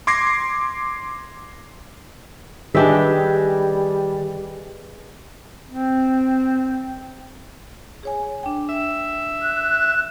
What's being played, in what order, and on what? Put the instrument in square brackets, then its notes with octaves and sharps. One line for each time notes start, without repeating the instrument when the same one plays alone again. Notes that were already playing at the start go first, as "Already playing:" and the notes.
[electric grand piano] C6 D6 G#6 A#6 C7
[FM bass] D#3 [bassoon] G3 [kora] D4 G4 E5 [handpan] G#4 B4 D#5
[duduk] C4
[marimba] G#4 C#5 G#5
D4 G5
[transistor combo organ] E5
[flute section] F#6